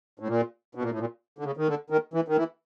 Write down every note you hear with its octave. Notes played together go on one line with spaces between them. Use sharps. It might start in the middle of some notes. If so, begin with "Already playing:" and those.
A2
A#2
B2
A#2
A2
A#2
D3
C#3
D#3
D3
D#3
E3
D#3
E3